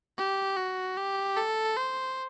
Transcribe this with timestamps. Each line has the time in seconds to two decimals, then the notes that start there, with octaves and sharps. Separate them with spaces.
0.18 G4
0.57 F#4
0.97 G4
1.37 A4
1.76 C5